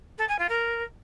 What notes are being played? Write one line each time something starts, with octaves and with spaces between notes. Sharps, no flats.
A4
G#5
F4
A#4